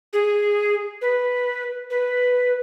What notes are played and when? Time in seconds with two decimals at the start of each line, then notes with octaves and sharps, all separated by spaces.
0.13 G#4
1.01 B4
1.90 B4